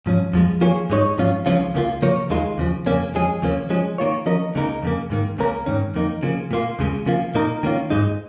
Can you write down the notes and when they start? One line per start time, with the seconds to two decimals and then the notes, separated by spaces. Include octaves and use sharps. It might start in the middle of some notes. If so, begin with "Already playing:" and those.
0.06 G#2 F3 C#4
0.33 F2 F3 G#3
0.61 F3 A#3 F4 G#4 C#5
0.90 G#2 G#3 D#4 C#5
1.18 G#2 F3 C#4 F4
1.46 C#2 C#3 F3 C#4 F4
1.74 C#2 C#3 A#3 F4
2.02 C#3 F3 A#3 F4 C#5
2.30 D#2 D#3 G#3 F4
2.58 D#2 C#3 F3
2.86 F2 C#3 A#3 C#4
3.14 F2 F3 G#3 C#4 G#4
3.42 D#2 C#3 F3 A#3 C#4
3.70 F3 G#3 C#4
3.98 D#3 A#3 F4 C#5
4.26 F3 C#4 A#4 D#5
4.55 C#2 C#3 A#3 D#4 A#4
4.82 F2 C#3 A#3
5.10 G#2 D#3 A#3
5.38 C#2 C#3 A#3 C#4 A#4
5.66 G#2 D#3 C#4
5.94 F2 D#3 A#3 D#4
6.23 C#3 F3 A#3
6.51 A#2 A#3 F4
6.79 D#2 C#3 G#3
7.06 C#3 F3 A#3 F4
7.35 A#2 A#3 D#4 A#4
7.63 D#3 A#3 C#4 F4
7.90 G#2 G#3 D#4